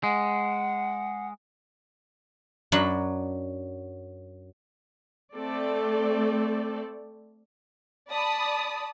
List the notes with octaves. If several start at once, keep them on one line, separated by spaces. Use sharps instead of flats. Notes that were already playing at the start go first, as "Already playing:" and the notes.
G#3 F#5
F#2 F#3 D4 B5
A3 C4 A4 D5
D5 A5 B5 D#6